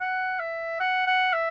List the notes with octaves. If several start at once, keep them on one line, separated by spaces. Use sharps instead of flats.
F#5
E5
F#5
F#5
E5